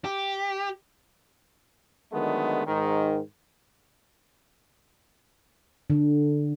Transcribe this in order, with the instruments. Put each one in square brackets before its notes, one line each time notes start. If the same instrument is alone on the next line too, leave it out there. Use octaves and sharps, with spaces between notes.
[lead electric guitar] G4
[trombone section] D3 D#3 F#3 G#3 A3 B3
G#2 D#3
[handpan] D3